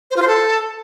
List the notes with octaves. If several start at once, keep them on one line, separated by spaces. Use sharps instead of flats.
C5
F4
C5
A4